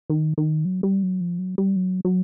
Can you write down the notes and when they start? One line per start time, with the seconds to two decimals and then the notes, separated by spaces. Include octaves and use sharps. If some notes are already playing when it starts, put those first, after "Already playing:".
0.10 D#3
0.38 D#3
0.65 F#3
0.83 G3
1.03 F#3
1.20 F3
1.39 F#3
1.58 G3
1.76 F#3
2.05 F#3